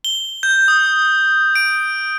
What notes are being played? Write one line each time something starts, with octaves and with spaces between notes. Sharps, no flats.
G7
G6
D#6
D7